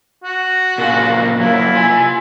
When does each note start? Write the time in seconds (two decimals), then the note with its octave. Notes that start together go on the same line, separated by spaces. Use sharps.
0.24 F#4
0.78 A#2 C#3 F4
1.40 F#3 A#3 E4
1.75 F4 G#5